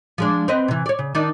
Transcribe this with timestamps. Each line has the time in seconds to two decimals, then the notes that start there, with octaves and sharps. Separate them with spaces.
0.18 F3 G#3 D4
0.48 C4 B4 D#5
0.68 C3 E3
0.86 C#5 D5
0.99 C#3
1.15 D#3 D4 D#4